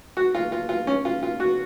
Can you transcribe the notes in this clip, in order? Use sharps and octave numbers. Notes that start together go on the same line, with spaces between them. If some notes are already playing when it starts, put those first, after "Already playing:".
F#4
F4
F4
F4
C#4
F4
F4
F#4